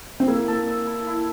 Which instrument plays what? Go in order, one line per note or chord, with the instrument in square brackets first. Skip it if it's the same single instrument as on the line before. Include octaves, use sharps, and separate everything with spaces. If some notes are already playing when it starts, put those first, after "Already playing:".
[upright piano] C4
[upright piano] A#3 [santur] E4
[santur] A4
E5
E4
E4